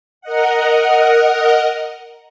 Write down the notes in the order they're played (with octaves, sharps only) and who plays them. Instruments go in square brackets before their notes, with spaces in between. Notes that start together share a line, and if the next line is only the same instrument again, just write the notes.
[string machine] A#4 D#5 F#5